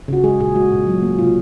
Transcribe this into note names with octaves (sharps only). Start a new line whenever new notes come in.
C#3 F#4
G#3 G#4
A#2 G#4
G#3 F#4
A#2
F#3
A#3
C3 F4